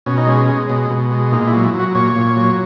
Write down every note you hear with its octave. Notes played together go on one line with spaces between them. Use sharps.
B2 C#4
D#4
G#3 C#4
G#3
B2
B2
G#3
A#2 D#4
E4
F#3
E4
F#3
F#4
A#2 C#5
A#2
F#3